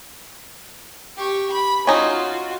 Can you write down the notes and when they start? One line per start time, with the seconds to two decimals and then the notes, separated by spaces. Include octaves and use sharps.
1.17 G4 C#6
1.52 B5
1.87 C#4 D#4 F4 F#4